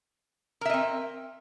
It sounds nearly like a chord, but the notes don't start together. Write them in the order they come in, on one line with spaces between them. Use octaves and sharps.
A#4 E5 D#5 C4